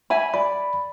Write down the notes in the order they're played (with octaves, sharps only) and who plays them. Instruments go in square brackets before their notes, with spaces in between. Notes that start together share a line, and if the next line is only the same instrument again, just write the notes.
[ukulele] E5 G#5 B5
[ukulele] D5 [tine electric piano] B5